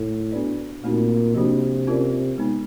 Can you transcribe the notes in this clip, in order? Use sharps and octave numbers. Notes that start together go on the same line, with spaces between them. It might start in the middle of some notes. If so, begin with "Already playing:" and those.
Already playing: A2
B3 D4 F#4 B4 D5
A#2 A3 C4 D#4 F#4
C3 F3 A#3 D4 F#4
C#4 F4 A#4 D5
G#3 B3 D#4